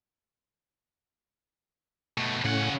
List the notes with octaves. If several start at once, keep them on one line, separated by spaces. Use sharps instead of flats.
B2 A3
A2 C#3 C#4 F#5